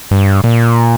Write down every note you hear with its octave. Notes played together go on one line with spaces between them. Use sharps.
G2
A#2